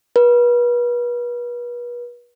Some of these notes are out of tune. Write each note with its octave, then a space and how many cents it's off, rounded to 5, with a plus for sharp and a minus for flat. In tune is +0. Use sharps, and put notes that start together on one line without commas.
B4 -35